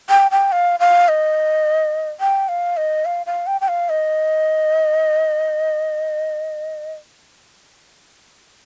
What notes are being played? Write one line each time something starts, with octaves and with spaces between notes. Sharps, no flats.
G5
G5
F5
F5
D#5
G5
F5
D#5
F5
F5
G5
G5
F5
D#5